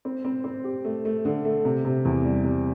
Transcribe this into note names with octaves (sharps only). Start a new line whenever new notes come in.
C4
C4
C4
G4
A3
A3
D3
A3
C3
C3
E2
G3
C3